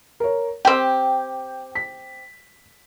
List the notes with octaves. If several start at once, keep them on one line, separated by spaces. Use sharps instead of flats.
A#4 C#5
C4 G4 G5
B6